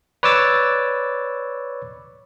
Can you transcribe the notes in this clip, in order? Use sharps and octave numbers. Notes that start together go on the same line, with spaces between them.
B4 C#5 D5 D6 E6 A6